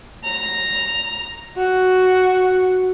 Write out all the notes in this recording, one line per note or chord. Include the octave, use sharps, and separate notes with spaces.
A#5
F#4